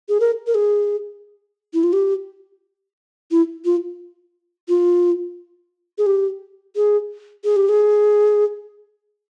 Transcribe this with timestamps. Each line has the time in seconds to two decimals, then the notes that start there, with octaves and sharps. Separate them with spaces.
0.09 G#4
0.20 A#4
0.47 A#4
0.55 G#4
1.74 E4
1.83 F4
1.93 G4
3.31 E4
3.65 F4
4.69 F4
5.98 G#4
6.06 G4
6.76 G#4
7.44 G#4
7.56 G4
7.69 G#4